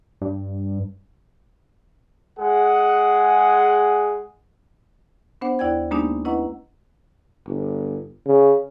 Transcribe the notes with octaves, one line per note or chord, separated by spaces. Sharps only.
G2
G#3 G#4 F#5
B3 D4 C5 F#5
D#2 E4 D5 G5 G#6
G#3 A#3 B3 D4 D#4 G4
C#4 E4 B4 D#5 F#5 A#5
G1
C#3